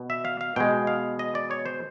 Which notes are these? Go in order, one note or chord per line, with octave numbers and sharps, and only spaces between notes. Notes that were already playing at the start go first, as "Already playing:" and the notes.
Already playing: B2
E5
F5
F5
B2 G#3 G5
F5
D#5
D5
C#5
C5